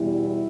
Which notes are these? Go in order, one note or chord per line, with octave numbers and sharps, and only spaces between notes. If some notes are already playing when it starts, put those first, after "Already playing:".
Already playing: E2 B2 G3 E4